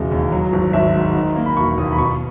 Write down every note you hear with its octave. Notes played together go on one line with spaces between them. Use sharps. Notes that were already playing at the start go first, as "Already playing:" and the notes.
Already playing: E1 C#3 G#3
D#2
F#3
G#1
G#1 E5
G#2
D#3
A#3
B5
E1 C#6
D#2 D#6
B5
B2 C#6